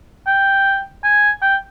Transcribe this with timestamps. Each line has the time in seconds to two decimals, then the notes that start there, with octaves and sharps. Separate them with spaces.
0.27 G5
1.04 G#5
1.42 G5